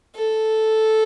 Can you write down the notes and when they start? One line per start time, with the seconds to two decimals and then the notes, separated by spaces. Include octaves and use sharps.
0.16 A4